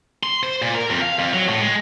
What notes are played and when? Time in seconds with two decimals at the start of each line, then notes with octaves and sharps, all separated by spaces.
0.23 C6
0.43 C5
0.62 A#2
0.74 A#4
0.90 F2
1.02 F5
1.19 F2
1.34 F#3
1.48 A2
1.61 G#3